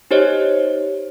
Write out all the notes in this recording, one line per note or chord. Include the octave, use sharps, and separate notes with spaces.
D#4 G4 C5 C#5 D#5